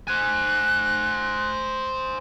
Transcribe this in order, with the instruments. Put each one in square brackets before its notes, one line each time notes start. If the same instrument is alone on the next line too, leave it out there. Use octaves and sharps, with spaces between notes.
[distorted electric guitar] C5 G#5 [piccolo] F#6